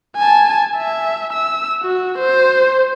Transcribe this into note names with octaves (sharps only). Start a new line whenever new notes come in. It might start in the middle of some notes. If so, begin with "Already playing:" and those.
G#5 A5
E5
E6
F#4
C5